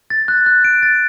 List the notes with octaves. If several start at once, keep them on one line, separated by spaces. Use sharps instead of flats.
A6
F#6
F#6
D7
A6